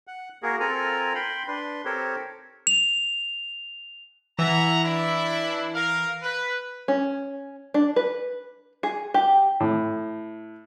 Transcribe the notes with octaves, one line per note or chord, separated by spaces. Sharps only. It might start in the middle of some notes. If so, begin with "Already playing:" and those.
F#5
A#3 F#4 G#4 A#4
C4 F4 A4 A#4 G#5 A#5
G5 B5 C6
D4 B4 C6
C4 G4 A4 A#4 C5 C#5
F7
E3 E5 F#5 A#5
D4 E4
A#4 F5
B4
C#4
D4
B4
G#4
G4
A2